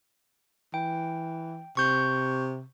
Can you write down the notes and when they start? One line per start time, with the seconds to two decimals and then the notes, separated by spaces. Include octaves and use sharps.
0.74 E3 G5
1.77 C3 C#6 G6